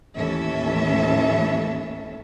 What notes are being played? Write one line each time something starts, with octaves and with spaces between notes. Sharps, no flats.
D#2 A2 E3 C#4 A4 E5